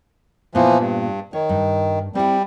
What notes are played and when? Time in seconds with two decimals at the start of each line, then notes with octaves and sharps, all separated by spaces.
0.55 A#2 E3 F3 B3
0.79 G2
1.33 D#3 C#5
1.49 G2
2.15 G3 C4 E4